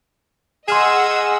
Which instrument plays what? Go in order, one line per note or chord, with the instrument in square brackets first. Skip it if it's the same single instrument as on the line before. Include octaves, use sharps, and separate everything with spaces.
[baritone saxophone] G#4 [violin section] D#5 F#5 E6 [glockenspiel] C6 F6 E7